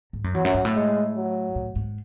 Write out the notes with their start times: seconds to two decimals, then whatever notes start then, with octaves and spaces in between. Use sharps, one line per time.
0.13 G#2
0.24 F#2
0.34 E2 F#3
0.45 F#2
0.54 G#2
0.65 A2
0.74 G#3
1.16 F#3
1.56 A2
1.76 G#2